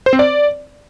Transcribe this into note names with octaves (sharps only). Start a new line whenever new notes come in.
C5
C4
D5